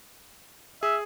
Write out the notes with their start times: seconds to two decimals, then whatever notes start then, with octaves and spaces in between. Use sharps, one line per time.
0.83 G#4 E5